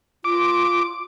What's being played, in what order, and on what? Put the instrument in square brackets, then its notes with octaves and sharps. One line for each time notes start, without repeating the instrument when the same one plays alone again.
[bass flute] F4 [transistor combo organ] D6